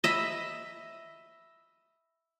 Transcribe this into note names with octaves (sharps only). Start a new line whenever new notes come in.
D#5 E5 B5